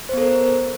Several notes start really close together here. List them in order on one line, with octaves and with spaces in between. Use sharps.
C5 B3 A4 A#4